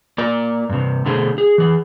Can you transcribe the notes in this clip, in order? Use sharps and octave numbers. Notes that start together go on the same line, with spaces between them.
A#3 A#4 D5
G2 C3
B2 D3 A3 C4 G#4
G#4
E3 G#4